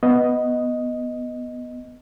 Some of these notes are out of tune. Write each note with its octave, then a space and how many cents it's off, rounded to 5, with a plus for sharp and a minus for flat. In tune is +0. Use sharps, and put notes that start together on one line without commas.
B3 +0 D#5 +0